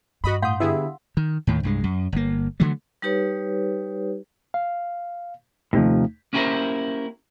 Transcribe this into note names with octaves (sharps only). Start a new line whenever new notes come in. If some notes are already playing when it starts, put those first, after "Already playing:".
G2 F#4 D#5 B5
A2 F5 F#5 C6 D#6 G6
D3 B3 E4 G4 G#4 E5
D#3
D#2 A2 D#3
C2 G2 G#3
F#2
G1 A#3
D3 E3 F#3 A3
G3 D#4 G4 B4 C#5
F5
D#2 A2 C3 F3 A3 D#4
A#3 C#4 E4 G4 A#4 C5